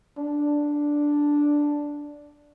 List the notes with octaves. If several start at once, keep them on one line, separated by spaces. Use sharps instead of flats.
D4